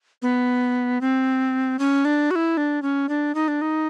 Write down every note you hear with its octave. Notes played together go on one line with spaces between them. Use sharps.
B3
C4
C#4
D4
F#4
E4
D4
C#4
D4
D#4
D4
D#4